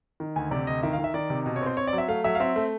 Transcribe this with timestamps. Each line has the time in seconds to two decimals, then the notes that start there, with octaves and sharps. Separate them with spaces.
0.20 D#3
0.36 D2 G#5
0.51 C3 D5
0.67 D2 D#5
0.83 D#3 E5
0.93 F5
0.99 D#3
1.04 E5
1.14 D#3 D5
1.30 C3
1.46 B2
1.56 C#5
1.62 C4 C5
1.77 C4 C#5
1.87 D5
1.93 F#3
1.98 E5
2.08 A3 F5
2.24 F#3 E5
2.35 F5
2.40 C4 E5
2.56 A3